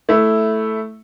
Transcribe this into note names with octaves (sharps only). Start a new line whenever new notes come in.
A3 E4